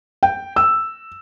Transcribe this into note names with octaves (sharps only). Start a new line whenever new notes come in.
G5
E6